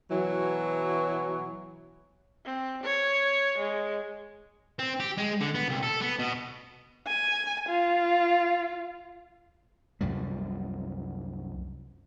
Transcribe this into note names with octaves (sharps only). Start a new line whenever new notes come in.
B2 E3 F#3
C4
C#5
G#3
C4
G4
G#3
D3
B3
C2
A4
B3
B2
G#5
F4
C2 F#2 F3 G3